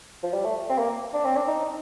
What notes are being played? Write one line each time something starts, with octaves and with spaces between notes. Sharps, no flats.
F3
G3
A3
C4
A#3
D4
C4
D4
D#4